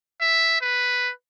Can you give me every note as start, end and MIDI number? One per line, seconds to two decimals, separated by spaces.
0.21 0.59 76
0.61 1.11 71